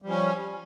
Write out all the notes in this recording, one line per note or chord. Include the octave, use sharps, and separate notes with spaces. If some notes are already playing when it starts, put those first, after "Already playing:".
F3 G3 C#4